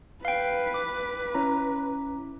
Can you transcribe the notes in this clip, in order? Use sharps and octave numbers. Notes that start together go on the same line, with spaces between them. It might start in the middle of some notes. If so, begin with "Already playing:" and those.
B4 F5 G5
D6
C#4 E4 A#5